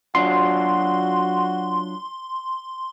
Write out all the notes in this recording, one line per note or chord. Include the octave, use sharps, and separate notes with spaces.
F#3 D4 F4 F#4 C6